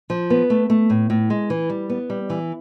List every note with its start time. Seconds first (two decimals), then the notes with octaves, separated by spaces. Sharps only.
0.10 F3
0.30 B3
0.50 A3
0.70 A3
0.90 A2
1.10 A2
1.30 G#3
1.50 E3
1.70 G3
1.90 B3
2.10 G3
2.30 E3